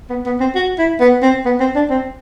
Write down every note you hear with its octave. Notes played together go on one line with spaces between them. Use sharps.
B3
B3
C4
F#4
E4
B3
C4
B3
C4
D4
C4